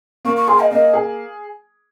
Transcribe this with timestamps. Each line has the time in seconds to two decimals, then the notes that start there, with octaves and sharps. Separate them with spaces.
0.25 A#3 C#6
0.37 C#6
0.48 G#4 C6
0.60 D#5
0.71 A#3 D#5
0.94 G#4